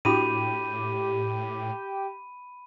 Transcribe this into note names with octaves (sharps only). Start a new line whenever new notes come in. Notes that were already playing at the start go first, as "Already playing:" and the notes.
A2 D4 E4 F#4 G4 B5 D#7